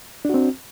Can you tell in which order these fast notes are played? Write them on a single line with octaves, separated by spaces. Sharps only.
D4 F#4 C4